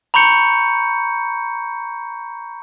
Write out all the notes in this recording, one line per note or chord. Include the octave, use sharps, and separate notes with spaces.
A#5 B5 C#6 G6 C#7